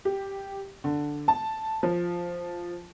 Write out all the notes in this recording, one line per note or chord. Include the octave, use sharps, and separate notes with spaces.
G4
D3
A5
F3